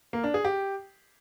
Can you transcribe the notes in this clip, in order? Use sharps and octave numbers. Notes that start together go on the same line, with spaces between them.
A#3
D4
G#4
G4